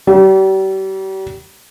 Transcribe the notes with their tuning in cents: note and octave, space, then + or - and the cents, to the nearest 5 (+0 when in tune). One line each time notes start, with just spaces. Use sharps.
G3 -40